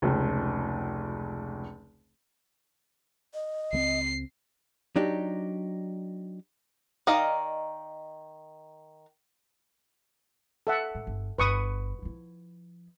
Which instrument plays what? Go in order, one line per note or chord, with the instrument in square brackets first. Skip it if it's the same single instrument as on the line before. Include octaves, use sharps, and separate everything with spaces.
[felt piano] F1 C#2
[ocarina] D#5
[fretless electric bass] C#2 G#3 C4 [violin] C7
[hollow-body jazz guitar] F#3 D4 D#4 G4
[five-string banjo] D#3 D5 D#5 F5 A#5
[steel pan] A4 E5 F#5
[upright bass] A2
G1
[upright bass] G1 [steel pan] B4 C#6 D#6
[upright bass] F3 E4